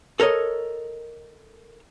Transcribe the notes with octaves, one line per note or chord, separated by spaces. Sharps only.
A4 A#4 C#5 D#5